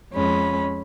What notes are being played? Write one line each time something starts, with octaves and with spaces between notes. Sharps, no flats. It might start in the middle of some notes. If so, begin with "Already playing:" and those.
F2 G#3 C#4 B5